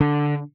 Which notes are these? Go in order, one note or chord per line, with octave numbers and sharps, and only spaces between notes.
D3